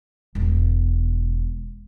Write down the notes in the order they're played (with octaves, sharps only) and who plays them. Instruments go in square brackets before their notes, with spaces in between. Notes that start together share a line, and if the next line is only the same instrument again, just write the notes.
[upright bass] E1 B2